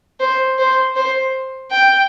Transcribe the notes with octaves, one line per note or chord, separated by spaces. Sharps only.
C5
C5
C5
G5